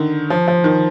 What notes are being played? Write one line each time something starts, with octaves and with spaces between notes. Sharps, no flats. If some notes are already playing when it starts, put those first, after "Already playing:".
Already playing: D3 D#3
F3
F3
D#3